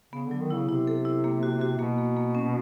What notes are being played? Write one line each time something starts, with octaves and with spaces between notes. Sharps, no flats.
C#3 B3
D3 F#3
D#3
C#3 E4
C3 E4
A4
E4
A#3
F#4
F#4
B2 A#3
A#3
A#3
C#4